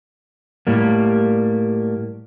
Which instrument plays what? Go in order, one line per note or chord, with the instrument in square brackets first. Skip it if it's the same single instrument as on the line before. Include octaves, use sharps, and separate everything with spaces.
[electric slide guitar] A2 G3 A#3